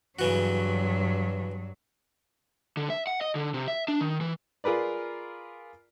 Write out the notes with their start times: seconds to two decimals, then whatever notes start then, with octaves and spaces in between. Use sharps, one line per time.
0.19 G2 C#3 E3 F#3 F#4
2.77 D3
2.90 E5
3.07 F#5
3.21 D#5
3.35 D3
3.54 C3
3.68 E5
3.88 D4
4.01 D#3
4.21 E3
4.64 F4 G#4 A#4 B4 D5